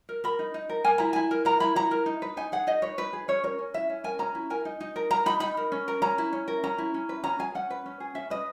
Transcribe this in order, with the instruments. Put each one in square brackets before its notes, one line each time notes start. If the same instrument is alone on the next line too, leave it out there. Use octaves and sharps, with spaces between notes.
[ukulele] A#4
A#4 B5
D#4
D#4
A#4
A#4 G#5
E4 A#5
E4 G#5
A#4
A#4 A#5
E4 B5
E4 A#5
A#4
D#4
B4
D#4 G#5
G#4 F#5
D#4 D#5
B4 C#5
D#4 B4
G#4
C#4 C#5
A#4 C#5
C#4
E4 E5
C#4
A#4 G#5
C#4 A#5
E4
A#4 G#5
D#4
D#4
A#4
A#4 A#5
D#4 B5
D#4 B5
A#4
C#4
A#4
C#4 A#5
E4
C#4
A#4
C#4 A#5
E4
C#4
B4
C#4 A#5
G#4 G#5
C#4 F#5
B4
C#4
G#4
C#4 E5
B4 D#5